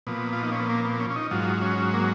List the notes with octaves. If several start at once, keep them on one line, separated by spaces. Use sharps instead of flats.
A#2 F3 B3
F4
D#4
C#4
B3
A#3
B3
C#4
C#4
D#4
G#2 F#3 F4
C#4
A#3